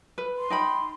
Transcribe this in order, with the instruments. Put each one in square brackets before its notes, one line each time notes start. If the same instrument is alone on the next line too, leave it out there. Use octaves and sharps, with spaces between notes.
[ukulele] B4
[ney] C6
[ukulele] D#4 G5 B5